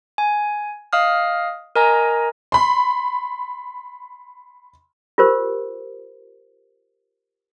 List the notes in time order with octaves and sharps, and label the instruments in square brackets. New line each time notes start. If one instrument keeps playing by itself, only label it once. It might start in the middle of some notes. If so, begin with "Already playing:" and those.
[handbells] G#5
D#5 F5 D#6 F6
A#4 D#5 G#5 A#5
[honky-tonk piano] B5 C6
[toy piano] F4 G4 A#4 C5